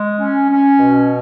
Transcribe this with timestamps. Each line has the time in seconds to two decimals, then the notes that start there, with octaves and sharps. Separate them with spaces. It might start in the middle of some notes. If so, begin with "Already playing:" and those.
Already playing: G#3
0.18 C#4
0.49 C#4
0.79 B2